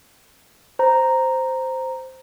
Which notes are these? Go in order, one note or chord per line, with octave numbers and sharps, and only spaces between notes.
C5 A#5